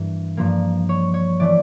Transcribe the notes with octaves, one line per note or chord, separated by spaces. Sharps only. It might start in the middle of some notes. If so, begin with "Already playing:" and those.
Already playing: G2 E3 A#3
G2 F3 A#3
C#5
C#5
E3 A3 D5